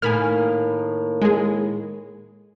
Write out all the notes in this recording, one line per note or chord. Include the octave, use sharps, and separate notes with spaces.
A2 D#3 A#3 G#5 B5 F6
G#3 G#4